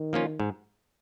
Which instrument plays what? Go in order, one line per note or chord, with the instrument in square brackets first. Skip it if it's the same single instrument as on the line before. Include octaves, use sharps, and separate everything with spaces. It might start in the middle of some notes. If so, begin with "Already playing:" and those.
Already playing: [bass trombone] D#3
[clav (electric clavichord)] F3 A#3 C#4 F4
G#2